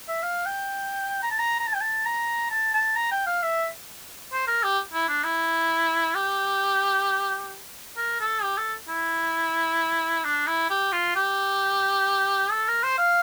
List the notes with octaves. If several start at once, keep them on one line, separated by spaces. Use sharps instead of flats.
E5
F5
G5
A#5
A5
A#5
A#5
A5
G5
A5
A#5
A5
A5
A#5
G5
F5
E5
C5
A#4
G4
E4
D4
E4
G4
A#4
A4
G4
A4
E4
D4
E4
G4
F4
G4
A4
A#4
C5
F5